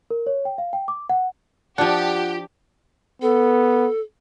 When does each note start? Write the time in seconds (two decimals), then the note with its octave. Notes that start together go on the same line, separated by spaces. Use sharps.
0.10 A#4
0.27 C#5
0.45 G5
0.58 F5
0.73 G5
0.88 D6
1.09 F#5
1.78 F3 D4 F4 G4 F#5
3.22 B3 A4